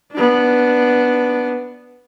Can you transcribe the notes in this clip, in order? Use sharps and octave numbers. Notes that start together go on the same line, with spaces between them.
B3 D4